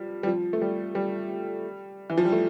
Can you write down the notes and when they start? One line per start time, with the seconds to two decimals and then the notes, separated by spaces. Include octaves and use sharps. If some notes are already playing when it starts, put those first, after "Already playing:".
Already playing: F3 G3
0.23 G3
0.27 F3
0.53 A3
0.61 G3
0.95 G3
2.10 E3
2.18 F3
2.25 G3
2.32 A3